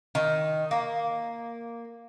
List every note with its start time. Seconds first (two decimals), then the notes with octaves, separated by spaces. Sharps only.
0.15 D#3
0.71 A#3